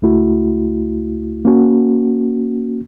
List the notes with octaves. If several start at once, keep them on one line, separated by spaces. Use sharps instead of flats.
C#2 A3 E4 F#4
A#3 C#4 F#4